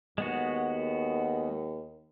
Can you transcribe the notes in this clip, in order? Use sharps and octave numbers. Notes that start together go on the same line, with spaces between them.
D#2 G#3 B3 F#4